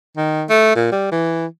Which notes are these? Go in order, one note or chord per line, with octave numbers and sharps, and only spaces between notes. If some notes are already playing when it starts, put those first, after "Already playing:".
D#3
A3
A#2
G3
E3